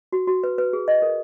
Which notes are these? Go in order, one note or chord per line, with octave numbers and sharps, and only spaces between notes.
F#4
F#4
B4
B4
G#4
D#5
A#4